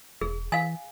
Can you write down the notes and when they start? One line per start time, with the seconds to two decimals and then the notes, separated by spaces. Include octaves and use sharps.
0.21 E1 G#4
0.52 E3 F5 G#5